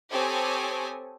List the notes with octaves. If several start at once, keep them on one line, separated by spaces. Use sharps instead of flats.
C4 G4 A4 C#5 G#5 D#6